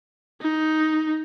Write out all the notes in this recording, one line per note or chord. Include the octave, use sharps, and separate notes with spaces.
D#4